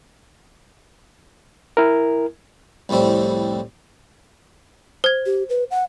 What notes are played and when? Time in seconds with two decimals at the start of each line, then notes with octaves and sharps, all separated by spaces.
1.77 E4 A#4
2.89 C2 F2 A2 G3 C4
5.04 C5 G#6
5.26 G4
5.49 B4
5.71 F#5